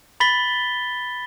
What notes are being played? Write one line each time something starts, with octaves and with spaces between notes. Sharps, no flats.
B5 A6 B6 G7